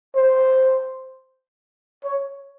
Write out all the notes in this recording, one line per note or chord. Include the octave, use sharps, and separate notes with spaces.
C5
C#5